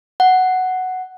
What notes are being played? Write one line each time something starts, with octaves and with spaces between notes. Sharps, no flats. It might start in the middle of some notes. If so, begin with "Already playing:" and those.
F#5